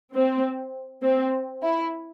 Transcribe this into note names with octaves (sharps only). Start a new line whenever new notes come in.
C4
C4
E4